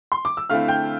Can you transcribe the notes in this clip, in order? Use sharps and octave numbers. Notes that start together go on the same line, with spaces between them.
C6
D6
E6
D3 A3 C4 E4 F5 F6
G5 G6